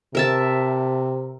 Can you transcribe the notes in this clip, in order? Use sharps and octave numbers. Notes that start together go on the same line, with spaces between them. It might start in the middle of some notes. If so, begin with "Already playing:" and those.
C3 A#4 E5 A5